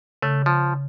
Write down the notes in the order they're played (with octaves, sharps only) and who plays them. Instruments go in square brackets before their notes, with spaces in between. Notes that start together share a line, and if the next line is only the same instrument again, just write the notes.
[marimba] C#3 [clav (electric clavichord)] A3
[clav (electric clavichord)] F3